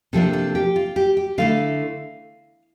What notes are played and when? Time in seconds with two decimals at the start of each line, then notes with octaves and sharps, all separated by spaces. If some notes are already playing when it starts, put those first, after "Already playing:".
0.13 C3 F3 A#3 D4 A4
0.33 A4
0.55 G4
0.76 F4
0.96 G4
1.17 G4
1.38 D3 A3 E4 F5